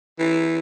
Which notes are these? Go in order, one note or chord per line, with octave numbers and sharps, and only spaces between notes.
E3